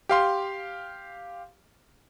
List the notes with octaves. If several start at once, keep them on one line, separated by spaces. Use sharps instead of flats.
G4 F5 C6